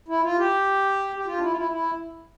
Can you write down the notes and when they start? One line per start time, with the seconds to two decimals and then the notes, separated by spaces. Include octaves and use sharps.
0.08 E4
0.23 F4
0.38 G4
1.16 G4
1.26 F4
1.37 D4
1.41 E4
1.51 F4
1.56 E4
1.71 E4